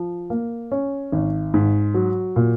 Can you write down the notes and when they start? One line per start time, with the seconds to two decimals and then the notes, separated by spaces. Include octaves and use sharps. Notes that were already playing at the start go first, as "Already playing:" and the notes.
Already playing: F3
0.30 A#3
0.72 C#4
1.12 G#1
1.54 G#2
1.94 F#3
2.36 A#2